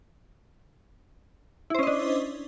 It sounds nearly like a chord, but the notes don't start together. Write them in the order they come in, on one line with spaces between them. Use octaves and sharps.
E4 C5 C#4 D#5 D4